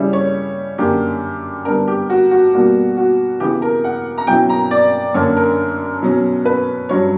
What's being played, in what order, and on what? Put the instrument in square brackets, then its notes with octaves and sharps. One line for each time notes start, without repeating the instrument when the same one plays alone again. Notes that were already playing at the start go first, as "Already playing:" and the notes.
Already playing: [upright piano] C#3 G3 C#4 E4
C#5
F#2 D3 A#3 G4
D3 G3 B3 D4 A#4
G4
F#4
F#4
B2 G3 A#3 F#4
F#4
C#3 E3 B3 G4
A#4
F#5
A#5
B2 F#3 C#4 E4 G5
A#5
D5
F#2 D3 A#3 D4 C#5
A#4
B2 F#3 C#4
B4
G2 F#3 C#4 C#5